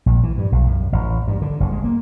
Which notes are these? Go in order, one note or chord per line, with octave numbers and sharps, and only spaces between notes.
A#1
E3
G2
B1
F#2
A1
G2
D3
F#1
G#3
A#3